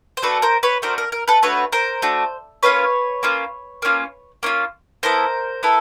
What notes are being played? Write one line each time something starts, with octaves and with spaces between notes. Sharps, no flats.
C5
A3 D4 F#4 A4 B4
A#4 C5
B4 C#5
A3 D4 F#4 A#4 C5
A#4
A#4
A4 B4
A3 D4 F#4 B4 C#5
A#4 C5
A3 D4 F#4
A#3 C#4 F4 B4 C#5
A#3 C#4 F4
A#3 C#4 F4
A#3 C#4 F4
B3 E4 A4 A#4 C5
B3 E4 A4